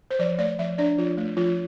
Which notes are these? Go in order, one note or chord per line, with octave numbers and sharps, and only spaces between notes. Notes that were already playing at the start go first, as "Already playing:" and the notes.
C5
F3 D5
A3 D5
F3 E5
D4 D5
F3 F4
A3
F3 F4